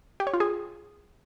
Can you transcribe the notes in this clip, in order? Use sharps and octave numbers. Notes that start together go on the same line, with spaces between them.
G4
C#5
F4
G#4